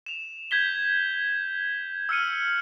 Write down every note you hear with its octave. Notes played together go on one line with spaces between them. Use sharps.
E7 F7
G6 G#6 B6 G7
E6 F6 C#7 D#7